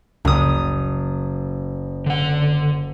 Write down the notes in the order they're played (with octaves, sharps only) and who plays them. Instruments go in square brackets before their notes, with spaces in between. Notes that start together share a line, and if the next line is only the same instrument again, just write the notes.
[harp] F#1 D#6 [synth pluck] C#2
[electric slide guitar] D3 F#5